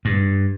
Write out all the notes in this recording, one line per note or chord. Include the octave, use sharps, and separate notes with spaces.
G2